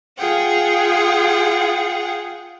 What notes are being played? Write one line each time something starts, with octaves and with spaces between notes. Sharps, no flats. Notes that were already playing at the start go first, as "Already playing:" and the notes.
F4 G#4 F#5 G5